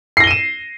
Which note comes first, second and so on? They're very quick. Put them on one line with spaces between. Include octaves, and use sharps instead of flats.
C7 A#6 G7 D#7 E7